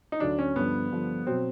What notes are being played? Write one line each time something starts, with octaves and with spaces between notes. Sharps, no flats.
D#4
D2 D3 F#3 D4
C#4
G2 D3 F3 B3
G2 D3 F3
B2 F#3 C4